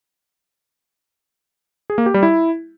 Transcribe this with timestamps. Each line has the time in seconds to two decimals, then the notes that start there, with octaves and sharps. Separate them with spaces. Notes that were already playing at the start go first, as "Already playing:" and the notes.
1.90 G#4
1.98 A#3
2.06 G4
2.14 G3
2.23 E4